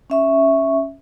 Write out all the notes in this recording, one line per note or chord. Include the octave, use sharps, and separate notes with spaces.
C#4 E5 C#6